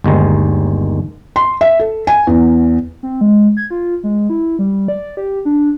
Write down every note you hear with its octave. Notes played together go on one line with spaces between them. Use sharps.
G1 D#2 D#3 G#3
C6
E5
A4
G#5
E2
C4
G#3
G#6
F4
G#3
E4
G3
D5
G4
D4